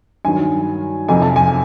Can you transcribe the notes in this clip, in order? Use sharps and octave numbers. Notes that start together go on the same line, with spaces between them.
G2 D#3 F#3 G#5
F2 C3 F3 G#5
A5
G#5